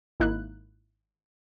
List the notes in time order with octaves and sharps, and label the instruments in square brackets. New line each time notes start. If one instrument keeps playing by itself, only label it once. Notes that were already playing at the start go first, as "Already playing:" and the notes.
[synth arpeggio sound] G#1 A#3 D#4 E4 F#6